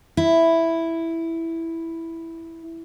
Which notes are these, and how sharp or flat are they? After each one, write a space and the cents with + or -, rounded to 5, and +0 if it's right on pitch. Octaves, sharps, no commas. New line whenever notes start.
E4 +0